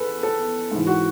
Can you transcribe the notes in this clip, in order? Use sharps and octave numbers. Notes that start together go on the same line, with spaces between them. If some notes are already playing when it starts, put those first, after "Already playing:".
Already playing: E2 A4 B4
A4
G#2 E3
F#4